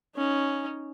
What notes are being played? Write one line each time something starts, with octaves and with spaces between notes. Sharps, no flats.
C#4 D#4